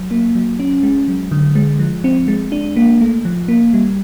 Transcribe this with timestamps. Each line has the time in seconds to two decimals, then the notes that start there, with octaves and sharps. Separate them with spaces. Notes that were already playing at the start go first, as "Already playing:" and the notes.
Already playing: F#3
0.11 A#3
0.35 F#3
0.60 C#4
0.83 G#3
1.08 F#3
1.31 D3
1.55 G#3
1.79 F3
2.04 C4
2.28 G#3
2.52 D4
2.76 A#3
3.01 A3
3.25 F3
3.48 A#3
3.73 G3